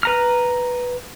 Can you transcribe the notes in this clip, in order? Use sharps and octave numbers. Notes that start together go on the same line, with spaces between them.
B4 A#5 F6